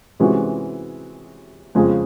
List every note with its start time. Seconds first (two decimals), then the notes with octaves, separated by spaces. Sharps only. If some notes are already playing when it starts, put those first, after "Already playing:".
0.20 C3 E3 G#3 C#4 F#4
1.75 F2 C#3 F3 G#3 C4